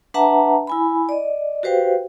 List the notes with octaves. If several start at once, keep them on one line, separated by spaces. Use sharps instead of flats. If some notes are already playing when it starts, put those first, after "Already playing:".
D4 B4 E5 F#5 A5 A#5
E4 G#5 B5
D5 D#5
F#4 G4 B4 C5 F5 G5